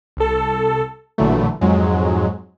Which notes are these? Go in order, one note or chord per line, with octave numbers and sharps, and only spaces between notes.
C2 A4
A1 A#2 D3 E3 F#3 A3
F2 G#2 F#3 G#3